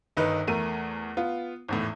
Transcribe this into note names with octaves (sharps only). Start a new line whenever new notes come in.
G1 D#3 D#4 B4
E2 A3 A#4 D#7
B3 F4
G#1 E2 A2